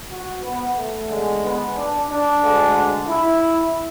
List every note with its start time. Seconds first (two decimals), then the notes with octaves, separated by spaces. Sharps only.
0.09 F#4
0.41 B3
0.75 A3
1.08 E2 D3 G#3
1.42 B3
1.74 D4
2.09 D4
2.42 D2 D3 G#3
3.07 E4